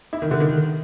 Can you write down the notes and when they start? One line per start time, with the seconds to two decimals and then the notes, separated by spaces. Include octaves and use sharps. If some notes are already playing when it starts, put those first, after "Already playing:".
0.13 E4
0.22 D#3
0.31 D3
0.40 D#3